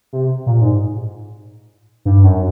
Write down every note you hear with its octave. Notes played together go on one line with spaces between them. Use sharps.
C3
A#2
G#2
G2
F#2